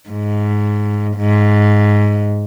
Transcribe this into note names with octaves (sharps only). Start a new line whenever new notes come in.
G#2
G#2